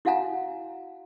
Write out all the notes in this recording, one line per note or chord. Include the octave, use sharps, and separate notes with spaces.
E4 F#4 F5 F#5 G#5 A#5